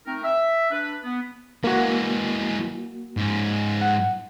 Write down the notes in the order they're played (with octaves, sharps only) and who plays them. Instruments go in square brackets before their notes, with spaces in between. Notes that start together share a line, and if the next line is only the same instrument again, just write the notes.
[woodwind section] A3 C4 D#4 A#4
E5
D4 B4
B3
[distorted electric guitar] E3 G#3 [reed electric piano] A#3 F#4
[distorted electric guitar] G#2 C#4
[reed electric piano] F#5